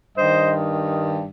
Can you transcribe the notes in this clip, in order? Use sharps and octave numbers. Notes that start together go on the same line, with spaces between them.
G2 D#3 C5 D#5